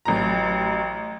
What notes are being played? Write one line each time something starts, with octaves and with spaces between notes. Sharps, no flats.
A1 F#3 A#5